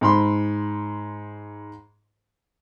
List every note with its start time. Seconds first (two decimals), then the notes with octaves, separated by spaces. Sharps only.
0.01 G#2 B5 C6